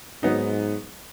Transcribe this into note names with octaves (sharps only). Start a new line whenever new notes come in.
G#2 F#3 B3 D#4